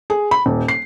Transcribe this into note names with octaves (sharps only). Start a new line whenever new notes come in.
G#4
B5
D#1
C7